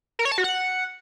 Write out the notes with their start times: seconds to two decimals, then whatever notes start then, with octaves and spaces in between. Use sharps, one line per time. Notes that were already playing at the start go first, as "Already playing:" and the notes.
0.19 A#4
0.25 C#5
0.32 A5
0.38 F#4
0.44 F#5